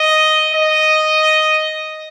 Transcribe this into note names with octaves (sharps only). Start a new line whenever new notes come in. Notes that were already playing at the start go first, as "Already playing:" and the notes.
Already playing: D#5
D#5